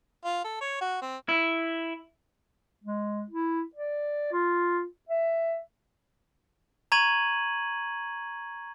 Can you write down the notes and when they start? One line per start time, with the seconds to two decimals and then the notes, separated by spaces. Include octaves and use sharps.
0.25 F4
0.44 A4
0.61 C#5
0.81 F#4
1.02 C4
1.29 E4
2.84 G#3
3.30 E4
3.75 D5
4.32 F4
5.09 E5
6.92 A#5 C#6 G#6 D#7 F#7